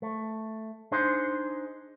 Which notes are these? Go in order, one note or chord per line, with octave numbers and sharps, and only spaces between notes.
A3
D4 D#4 G#4 C5